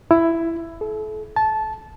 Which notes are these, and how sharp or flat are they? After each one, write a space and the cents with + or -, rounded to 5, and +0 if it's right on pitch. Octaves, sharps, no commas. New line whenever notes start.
E4 +10
A4 -35
A5 -15